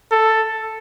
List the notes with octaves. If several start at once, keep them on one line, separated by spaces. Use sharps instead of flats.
A4